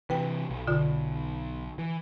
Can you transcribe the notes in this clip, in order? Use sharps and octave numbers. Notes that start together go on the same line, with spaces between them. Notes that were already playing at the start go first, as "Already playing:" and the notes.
C3 E3 B4 G5
B1
B2 D3 F4
E3